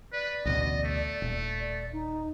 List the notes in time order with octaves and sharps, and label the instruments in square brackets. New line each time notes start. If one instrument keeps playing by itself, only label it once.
[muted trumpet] B4 [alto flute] D5
[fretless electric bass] A1 D2 B2 [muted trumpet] D#5
[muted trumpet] A3
[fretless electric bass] D#1
[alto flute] D5
D#4